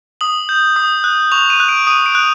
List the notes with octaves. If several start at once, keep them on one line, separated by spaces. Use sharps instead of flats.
D#6 F#7
G6
D#6
F#6
C#6 F7
D#7
F#6
D7
D#6 D#7
D7
F#6